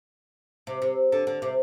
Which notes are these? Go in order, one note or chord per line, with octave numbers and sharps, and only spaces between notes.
C3
C3
D3
D3
C3